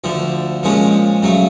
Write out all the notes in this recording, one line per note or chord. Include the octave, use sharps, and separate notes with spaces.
D2 D3 F3
A#2 F3 G#3 C#4
C#3 F#3 A3